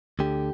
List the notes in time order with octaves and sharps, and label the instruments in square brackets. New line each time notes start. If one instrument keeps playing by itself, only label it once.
[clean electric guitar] D2 D3 G4